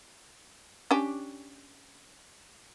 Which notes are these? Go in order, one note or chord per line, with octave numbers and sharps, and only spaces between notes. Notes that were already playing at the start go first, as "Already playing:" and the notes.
C#4 D4 G4